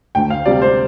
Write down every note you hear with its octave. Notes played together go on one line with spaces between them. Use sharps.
D2 G5
F5
C3 G3 D5
C5